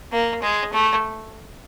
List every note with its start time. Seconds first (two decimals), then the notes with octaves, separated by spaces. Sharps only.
0.12 A#3
0.42 G#3
0.73 A3